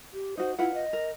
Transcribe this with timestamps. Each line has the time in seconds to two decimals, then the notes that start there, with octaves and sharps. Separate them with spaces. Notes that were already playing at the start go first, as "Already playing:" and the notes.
0.13 G4
0.37 D#4 F#4 C5
0.59 E4 F4 B4 F#5
0.74 D#5
0.93 A#4